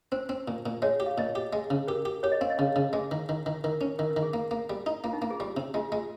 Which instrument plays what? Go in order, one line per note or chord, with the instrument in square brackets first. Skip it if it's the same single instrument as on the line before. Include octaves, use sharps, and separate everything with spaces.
[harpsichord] C4 [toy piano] C5
[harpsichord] C4
A#2
A#2
[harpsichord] G#3 [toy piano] C#5
[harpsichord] G4
[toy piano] F5
[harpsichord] A#2 [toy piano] D#5
[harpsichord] G4
G#3
C#3
[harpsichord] G4 [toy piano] A#4
[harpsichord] G4
[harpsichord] G4 [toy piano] C#5
[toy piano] D#5
[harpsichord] C4 [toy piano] F5
[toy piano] D#5
[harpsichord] C#3 [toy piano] F5
[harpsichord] C#3
[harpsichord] G#3 [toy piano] G#4
[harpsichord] D#3
D#3
D#3
[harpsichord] D#3 [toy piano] A#4
[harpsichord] C#4
[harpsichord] D#3 [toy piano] A#4
[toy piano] A#4
[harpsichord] D#3
[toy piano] G#4
[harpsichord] A#3
A#3
G3
D#4
[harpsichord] A#3 [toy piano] F4
[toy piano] D#4
[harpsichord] A#3 [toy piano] F4
[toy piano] G#4
[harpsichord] G3 [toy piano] G4
[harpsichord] C3
[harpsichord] G#3 [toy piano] F4
[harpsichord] G#3